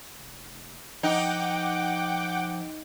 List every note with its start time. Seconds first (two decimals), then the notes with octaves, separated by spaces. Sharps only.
0.19 F1
1.03 F3 D#4 F#5 G5 D6